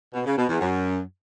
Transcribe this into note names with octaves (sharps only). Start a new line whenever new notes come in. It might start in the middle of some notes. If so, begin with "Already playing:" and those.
B2
C#3
B2
E2
F#2